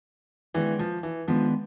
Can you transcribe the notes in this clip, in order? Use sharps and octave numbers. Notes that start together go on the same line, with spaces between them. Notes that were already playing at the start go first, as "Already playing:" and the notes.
D#3 E3 G#3 B3 D4
F3
E3
D#3 F3 G#3 B3 D4